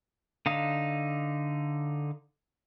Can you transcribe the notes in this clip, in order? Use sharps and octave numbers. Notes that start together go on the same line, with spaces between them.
D3 D#4 F5 D#6